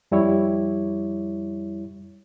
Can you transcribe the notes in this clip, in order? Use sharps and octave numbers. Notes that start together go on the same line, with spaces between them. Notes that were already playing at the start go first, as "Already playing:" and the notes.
F2 G3 E4 C#5